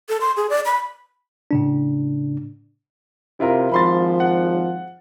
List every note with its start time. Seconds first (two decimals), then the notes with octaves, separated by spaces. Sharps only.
0.09 A4
0.21 C6
0.37 G#4
0.50 D5
0.66 B5
1.51 A2 C#3 D4
3.40 C3 E4 F4 A#4
3.72 G#1 F3 B5 C6 A6
4.20 F#5